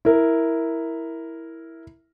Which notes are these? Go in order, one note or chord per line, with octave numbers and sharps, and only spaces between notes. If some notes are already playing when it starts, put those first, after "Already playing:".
E4 A#4